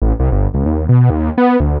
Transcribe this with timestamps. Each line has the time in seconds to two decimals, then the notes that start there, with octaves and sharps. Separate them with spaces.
0.02 A1
0.20 C2
0.32 G1
0.54 C#2
0.66 D#2
0.89 B2
1.10 D#2
1.38 B3
1.60 D2